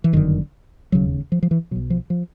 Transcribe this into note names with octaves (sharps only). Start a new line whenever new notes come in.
E3
G1 F#2 D3 D#3
E1 D#2 C#3 F#3
F3
F3
E3
B1 B2 F#3
F3
F3